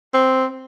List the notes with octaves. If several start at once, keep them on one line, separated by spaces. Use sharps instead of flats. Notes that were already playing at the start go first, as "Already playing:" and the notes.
C4